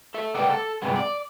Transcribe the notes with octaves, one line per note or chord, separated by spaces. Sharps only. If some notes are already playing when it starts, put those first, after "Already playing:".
A4 E5
C#2 A#3 B4 D5 F#5 G5
A4
G2 C3 G#3 B3
D5